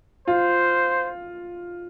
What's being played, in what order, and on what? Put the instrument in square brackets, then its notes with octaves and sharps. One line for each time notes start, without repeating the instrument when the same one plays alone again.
[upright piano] F4 [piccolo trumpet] C5